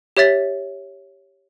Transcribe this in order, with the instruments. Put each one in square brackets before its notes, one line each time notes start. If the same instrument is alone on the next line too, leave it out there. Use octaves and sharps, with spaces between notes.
[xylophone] G4 C#5 E5 A6 B6